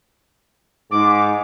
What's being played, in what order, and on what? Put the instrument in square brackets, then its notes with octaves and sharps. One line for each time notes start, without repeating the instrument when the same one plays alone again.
[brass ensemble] G#2 [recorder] D6